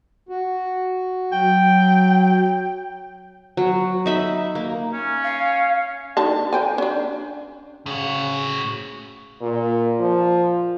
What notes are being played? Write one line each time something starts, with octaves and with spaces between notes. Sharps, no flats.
F#4
F#3 G5
F#3
D#4 E5 B5
A#3
C#4
F5
D3 D#3 A5
C5 G5 G#5
C#4 D4
A2 C#3 F#4
A#2
F3